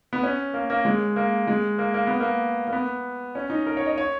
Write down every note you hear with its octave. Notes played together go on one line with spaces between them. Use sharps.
B3
C#4
A#3
A#3
G#3
A#3
G#3
A#3
A#3
B3
A#3
A#3
B3
C#4
D#4
A#4
C#5
D#5
C#5